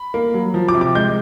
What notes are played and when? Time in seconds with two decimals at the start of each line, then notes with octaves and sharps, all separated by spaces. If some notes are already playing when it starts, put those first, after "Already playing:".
Already playing: B5
0.14 A#3
0.34 F#3
0.54 F3
0.68 D6
0.75 C3
0.81 D6
0.95 G#3 G6